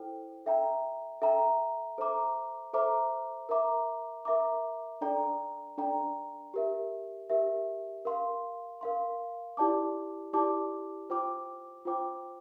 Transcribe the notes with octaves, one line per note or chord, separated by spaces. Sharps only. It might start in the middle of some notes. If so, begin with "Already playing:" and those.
Already playing: E4 A4 C5 G5
A4 E5 G5 A#5
A4 E5 G5 A#5
A4 C5 E5 A#5 D6
A4 C5 E5 A#5 D6
A#4 E5 A#5 D6
A#4 E5 A#5 D6
D4 A4 D5 G5 A#5
D4 A4 D5 G5 A#5
G4 A#4 E5
G4 A#4 E5
A#4 F5 C6
A#4 F5 C6
E4 G4 D5 A5 D6
E4 G4 D5 A5 D6
F4 C5 G5 D6
F4 C5 G5 D6